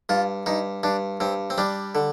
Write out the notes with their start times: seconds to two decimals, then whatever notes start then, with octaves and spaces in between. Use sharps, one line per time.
0.09 G2 F4
0.46 G2 D#4
0.83 G2 D4
1.20 G2 C4
1.50 C4
1.58 G3 D4
1.95 D3